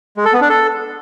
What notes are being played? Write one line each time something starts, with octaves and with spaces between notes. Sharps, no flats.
G#3
A4
B3
D4
A4